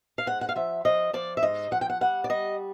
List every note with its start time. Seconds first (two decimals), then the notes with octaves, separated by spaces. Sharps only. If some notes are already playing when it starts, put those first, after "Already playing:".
0.18 F5
0.26 G#2 F#5
0.41 F#5
0.49 F5
0.56 F3 E5
0.85 F3 D#5
1.13 F3 D5
1.37 E5
1.42 G#2 D#5
1.71 F3 F#5
1.81 G5
1.90 F#5
2.01 G3 F#5
2.24 D5
2.30 G3 D#5